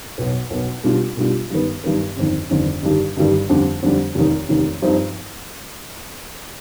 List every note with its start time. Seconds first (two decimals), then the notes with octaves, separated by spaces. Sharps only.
0.18 B1 B2 B3
0.50 B1 B2 B3
0.84 B2 G3 D4 F4
1.17 B2 G3 D4 F4
1.50 G2 D#3 B3
1.84 G2 D#3 B3
2.16 G1 F2 D#3
2.49 G1 F2 D#3
2.82 G1 G2 D#3 G3
3.17 G1 G2 D#3 G3
3.49 F2 D3 G3 D4
3.82 F2 D3 G3 D4
4.15 F1 D#2 D#3
4.49 F1 D#2 D#3
4.82 G2 F3 C4 D#4